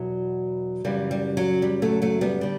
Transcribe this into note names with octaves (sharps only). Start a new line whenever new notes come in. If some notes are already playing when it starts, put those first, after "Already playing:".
Already playing: E2 B2 F#3
F#2 C#3 E3 G3
G3
F#3
G3
F#3 A3
F#3 A3
G3 B3
D3 G3